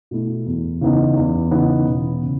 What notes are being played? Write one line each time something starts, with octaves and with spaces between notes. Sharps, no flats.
B2 A3 E4
E2
C#3 E3 B3 D#4
E2
C#3 E3 B3 D#4
E1
C#3